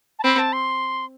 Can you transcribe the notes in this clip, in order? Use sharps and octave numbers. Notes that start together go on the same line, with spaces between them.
A5
C4 B5
A5
C6